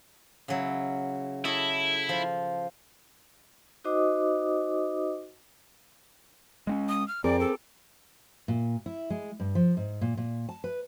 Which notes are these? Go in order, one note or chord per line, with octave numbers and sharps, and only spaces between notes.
C#3 F#3 E4
E4 A4 C#5 D#5
F3 F4
D#4 F#4 C5 D#5 D6 D#6
G#3 C4 C#4
D#6
F6
F2 C4 G#4 A#4 D5 D6
A4
A#2
E4
G#3
G2
F3
G#2
A#2
A#2
A5
B4